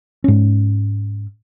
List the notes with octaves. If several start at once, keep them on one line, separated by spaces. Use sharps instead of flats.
G#2 C#4